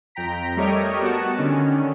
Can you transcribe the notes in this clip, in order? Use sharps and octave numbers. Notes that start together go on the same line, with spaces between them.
F2 G5 A#5 B6
G3 A3 G4 A#4 C#5 D#5
B3 F#4 F#5 A5
D3 D#3 C#4